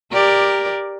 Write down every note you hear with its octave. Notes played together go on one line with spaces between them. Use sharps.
G4 A#4 D5